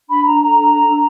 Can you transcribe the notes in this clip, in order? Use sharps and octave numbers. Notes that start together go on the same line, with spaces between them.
D4 B5
D4 A#5
A4 A#5
D4
A4
D4